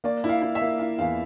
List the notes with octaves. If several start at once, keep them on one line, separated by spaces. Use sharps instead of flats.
A#3 D5
E4
F5
E4
E5
A#3
E4 F5
E2 F5